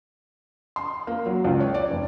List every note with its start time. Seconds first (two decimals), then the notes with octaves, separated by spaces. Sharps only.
0.76 C6
1.07 A#3
1.26 F#3
1.44 C#2
1.60 C#5
1.74 D5
1.90 F1